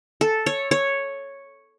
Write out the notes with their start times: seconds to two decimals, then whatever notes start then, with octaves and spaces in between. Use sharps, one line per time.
0.21 A4
0.46 C#5
0.71 C#5